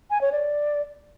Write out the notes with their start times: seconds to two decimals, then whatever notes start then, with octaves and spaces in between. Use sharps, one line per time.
0.10 G#5
0.21 C#5
0.32 D5